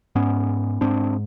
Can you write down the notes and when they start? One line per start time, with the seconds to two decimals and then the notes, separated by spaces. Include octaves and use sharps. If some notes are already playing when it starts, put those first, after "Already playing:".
0.15 G#2 B3 C#4
0.81 G#2 C4 D4